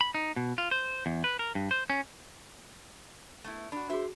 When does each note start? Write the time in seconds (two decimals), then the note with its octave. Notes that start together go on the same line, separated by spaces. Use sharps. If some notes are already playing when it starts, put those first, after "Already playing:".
0.01 B5
0.15 D#4
0.36 B2
0.58 F4
0.71 C5
1.06 E2
1.24 B4
1.39 A#4
1.55 G2
1.71 C5
1.90 C#4
3.44 A3 B3 E4
3.72 D4 F#4 B5
3.90 F#4 G#4 C5 E5